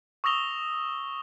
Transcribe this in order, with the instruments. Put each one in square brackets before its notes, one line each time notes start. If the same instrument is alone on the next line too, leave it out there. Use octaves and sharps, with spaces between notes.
[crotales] C#6 D#6 E6 A#6 F7 G7